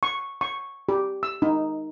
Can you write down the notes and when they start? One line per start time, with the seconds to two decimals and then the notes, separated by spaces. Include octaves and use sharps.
0.03 C#6
0.41 C#6
0.89 G4
1.23 E6
1.42 D#4